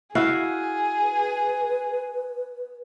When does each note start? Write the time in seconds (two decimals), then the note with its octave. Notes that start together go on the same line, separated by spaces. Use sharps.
0.15 E4 F#4 G#4 F5
1.02 B4